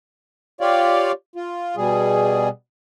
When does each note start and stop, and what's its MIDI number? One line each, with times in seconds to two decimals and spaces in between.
0.61 1.12 65
0.61 1.12 67
0.61 1.12 73
0.61 1.12 74
0.61 1.12 77
1.36 1.76 65
1.77 2.49 47
1.77 2.49 55
1.77 2.49 68